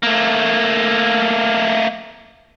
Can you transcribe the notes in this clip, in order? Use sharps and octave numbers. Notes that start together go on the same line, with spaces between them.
A3 A#3